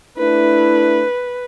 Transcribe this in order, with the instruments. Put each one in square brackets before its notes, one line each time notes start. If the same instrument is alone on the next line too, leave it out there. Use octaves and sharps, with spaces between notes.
[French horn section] A3 D4 E4 [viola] B4